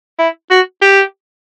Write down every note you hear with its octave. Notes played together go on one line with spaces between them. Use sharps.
E4
F#4
G4